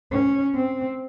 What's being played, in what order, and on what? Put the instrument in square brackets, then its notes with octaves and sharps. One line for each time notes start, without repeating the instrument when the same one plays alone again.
[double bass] C#4
C4